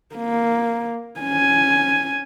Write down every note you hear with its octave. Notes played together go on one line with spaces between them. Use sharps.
A#3
C#4 G#5